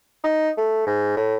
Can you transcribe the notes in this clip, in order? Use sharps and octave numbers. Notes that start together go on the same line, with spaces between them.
D#4
A3
G#2
A2